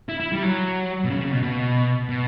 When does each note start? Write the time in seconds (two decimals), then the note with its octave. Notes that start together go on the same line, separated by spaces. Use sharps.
0.09 E4
0.20 E4
0.32 G3
0.43 F#3
1.04 B2
1.10 C#3
1.21 C#3
1.32 B2
1.43 B2
2.09 B2